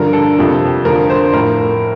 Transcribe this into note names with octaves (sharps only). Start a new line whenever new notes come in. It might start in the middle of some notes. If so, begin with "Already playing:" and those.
Already playing: G2 D3 F3 A#4
A4
F2 C3 F3
F2 D3 F3 A#4
C5
A2 F3 A#4